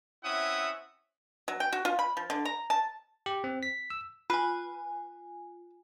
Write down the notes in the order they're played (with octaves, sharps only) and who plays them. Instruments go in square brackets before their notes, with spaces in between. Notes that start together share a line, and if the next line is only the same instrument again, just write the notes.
[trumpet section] C4 C#4 E4 E5 F#5 D#6
[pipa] F#3
G5
F#4
F4
B5
F3
D3
A#5
A5
[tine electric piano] G4
C4
B6
E6
[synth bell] F4 G#5 [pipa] B4